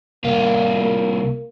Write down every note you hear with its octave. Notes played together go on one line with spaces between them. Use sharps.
C2 A#3 F4
A#3